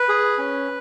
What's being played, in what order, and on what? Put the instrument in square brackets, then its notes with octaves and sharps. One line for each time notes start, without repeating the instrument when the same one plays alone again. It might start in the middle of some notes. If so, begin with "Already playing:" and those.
Already playing: [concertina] B4
G#4
C#4